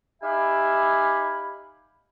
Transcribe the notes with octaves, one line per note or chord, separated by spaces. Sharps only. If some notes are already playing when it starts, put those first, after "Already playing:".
D#4 G4 E5 F5 G#5 B5